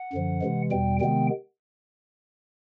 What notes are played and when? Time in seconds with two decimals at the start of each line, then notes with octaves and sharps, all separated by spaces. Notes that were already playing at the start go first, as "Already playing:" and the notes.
Already playing: F#5
0.13 F#2 D3 F3
0.41 C3 E3 G#3
0.71 E2 B2 G3 G5
1.00 C3 D#3 G#3 B3 G5